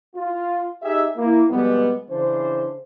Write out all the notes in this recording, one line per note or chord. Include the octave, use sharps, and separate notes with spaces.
F4
D#4 G4 G#4 D#5 E5
A#3 E4
F2 B2 G3 G#3 B3
C#3 E3 D4 C5